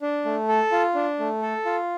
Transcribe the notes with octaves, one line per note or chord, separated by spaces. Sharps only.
D4
A3
A4
F4
D4
A3
A4
F4